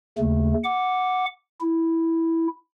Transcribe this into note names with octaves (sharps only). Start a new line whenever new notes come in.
D#2 C#3 A3
F#5 D6
E4